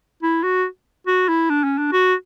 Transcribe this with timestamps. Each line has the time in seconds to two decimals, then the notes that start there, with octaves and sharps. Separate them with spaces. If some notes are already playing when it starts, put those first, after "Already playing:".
0.23 E4
0.43 F#4
1.07 F#4
1.28 E4
1.50 D4
1.64 C#4
1.78 D4
1.92 F#4